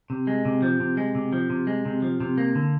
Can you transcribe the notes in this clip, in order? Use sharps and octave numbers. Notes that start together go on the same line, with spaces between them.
C3
G#3
C3
F3
C3
G#3
C3
F3
C3
G#3
C3
F3
C3
A#3
D3